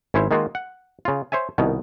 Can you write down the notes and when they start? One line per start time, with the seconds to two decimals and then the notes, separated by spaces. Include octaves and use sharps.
0.14 G#1 C#4 E4 C5 C#5
0.31 D#3 G#3 A#3 F4 F#4
0.55 F#5
1.05 C#3 F4
1.32 C5 C#5 E5 G#5
1.58 C2 B2 D#3